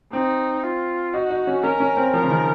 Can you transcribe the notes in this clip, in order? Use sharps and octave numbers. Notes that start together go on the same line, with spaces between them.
C4 D#4
F4
D#4 F#4
D#4
C#4
C#4 A#4
C#4
C4
F3 A#4
C#3
D#3